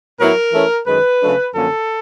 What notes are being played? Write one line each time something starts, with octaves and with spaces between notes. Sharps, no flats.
A2 F#3 B3 E4 A#4
E3 A3 C#4 E4
F#2 D#3 G#3 B4
C#3 F#3 A3 D4
F#2 D3 F3 A#3 C#4 A4